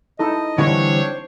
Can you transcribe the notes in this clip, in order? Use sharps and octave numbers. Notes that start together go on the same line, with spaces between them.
D#4 E4 A4 D#5
D3 E3 G3 C4 D4 C#5
C5